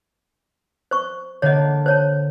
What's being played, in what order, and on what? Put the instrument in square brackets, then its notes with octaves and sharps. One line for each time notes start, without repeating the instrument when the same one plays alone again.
[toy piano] C5 C#6
[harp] D3 A#3 [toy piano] C#5 D#5
[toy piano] C5 C#5 A5